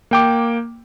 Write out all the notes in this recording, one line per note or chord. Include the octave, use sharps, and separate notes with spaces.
A#3 G5 D6